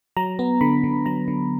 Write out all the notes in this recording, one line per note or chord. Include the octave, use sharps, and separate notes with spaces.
F#3 A#5
B3
D3 B5
D3
F#3 A#5
D3